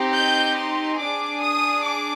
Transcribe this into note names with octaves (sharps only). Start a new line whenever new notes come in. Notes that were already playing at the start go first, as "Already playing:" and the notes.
Already playing: C4 D#4 G4
G6
C6
D4 G#4 D6
D#6
D6